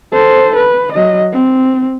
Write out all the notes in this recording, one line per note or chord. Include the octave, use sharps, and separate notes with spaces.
A4 C5
B4
F#3 D#5
C4